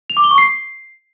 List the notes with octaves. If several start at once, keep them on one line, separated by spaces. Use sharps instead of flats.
F7
D6
G7
C#6
C7